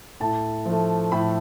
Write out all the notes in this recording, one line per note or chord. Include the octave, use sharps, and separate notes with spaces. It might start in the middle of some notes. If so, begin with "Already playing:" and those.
A2 A5
F3 A3
A2 B5